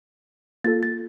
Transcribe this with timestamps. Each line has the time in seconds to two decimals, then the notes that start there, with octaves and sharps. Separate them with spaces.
0.64 A#3 F4 A4 A6
0.83 A6